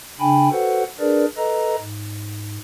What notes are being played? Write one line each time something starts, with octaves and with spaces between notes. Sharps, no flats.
C#3 D4 G5 G#5 B5
F#4 A4 B4 C5 F#5
D4 G#4 A#4 B4 D5
A4 B4 D#5 A#5
G#2